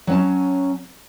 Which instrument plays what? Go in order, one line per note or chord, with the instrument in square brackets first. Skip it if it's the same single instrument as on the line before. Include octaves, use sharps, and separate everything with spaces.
[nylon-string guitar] F#3 C#4 A5